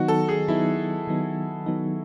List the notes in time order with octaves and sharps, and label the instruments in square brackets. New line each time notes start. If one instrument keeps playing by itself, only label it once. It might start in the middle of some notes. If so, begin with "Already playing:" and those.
Already playing: [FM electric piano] D#3 F#3 B3 D#4 [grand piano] F#4
[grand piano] A4
G#4
[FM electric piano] D#3 F#3 B3 D#4 [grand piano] E4
[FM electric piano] D#3 F#3 B3 D#4
D#3 F#3 B3 D#4